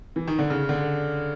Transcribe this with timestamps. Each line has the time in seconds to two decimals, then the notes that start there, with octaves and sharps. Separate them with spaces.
0.16 E3
0.27 D#3
0.39 D3
0.50 C#3
0.69 D3